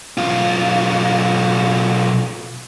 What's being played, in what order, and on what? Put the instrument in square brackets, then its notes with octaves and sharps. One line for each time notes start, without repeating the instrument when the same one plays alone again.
[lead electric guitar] B1 F4